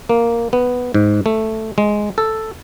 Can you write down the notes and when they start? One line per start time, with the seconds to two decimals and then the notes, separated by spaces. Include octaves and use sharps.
0.09 A#3
0.53 B3
0.94 G#2
1.26 A3
1.78 G#3
2.18 A4